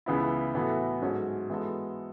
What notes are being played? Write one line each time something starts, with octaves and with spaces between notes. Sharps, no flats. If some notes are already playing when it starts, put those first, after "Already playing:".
C#2 C#3 E3 B3 E4
A2 E3 B3 F#4 A4
G#2 F#3 C#4 F#4 A4
E3 G#3 B3 F#4 A4